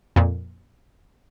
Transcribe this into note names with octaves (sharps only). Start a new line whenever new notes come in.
F2 A#2